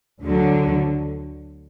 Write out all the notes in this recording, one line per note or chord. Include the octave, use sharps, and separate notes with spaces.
D2 D3 F#3